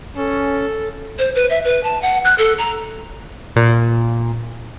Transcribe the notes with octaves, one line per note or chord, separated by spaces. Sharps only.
C#4 A4
C5
B4
E5
B4
A5
F#5
F#6
A4
A#5
A#2